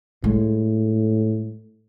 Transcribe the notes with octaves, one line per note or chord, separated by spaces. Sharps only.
A2 G#3